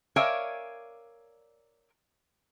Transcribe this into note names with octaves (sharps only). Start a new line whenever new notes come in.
A#4 C#5 D5 E5 F5 G#5